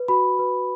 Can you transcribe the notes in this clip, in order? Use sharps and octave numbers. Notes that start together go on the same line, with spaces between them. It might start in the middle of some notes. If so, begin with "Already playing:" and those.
Already playing: B4
F#4 B5
B4